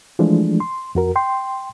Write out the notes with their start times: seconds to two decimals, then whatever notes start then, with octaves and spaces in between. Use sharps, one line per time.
0.19 E3 F3 G#3 A3 D4
0.60 C6
0.95 F2 F#4 A#4
1.16 G5 C6